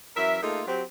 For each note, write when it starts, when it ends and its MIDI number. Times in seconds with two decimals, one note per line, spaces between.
0.16 0.40 42
0.16 0.40 52
0.16 0.40 70
0.16 0.40 76
0.42 0.62 57
0.42 0.62 58
0.42 0.62 63
0.42 0.62 65
0.42 0.62 68
0.42 0.62 69
0.67 0.82 54
0.67 0.82 60
0.67 0.82 67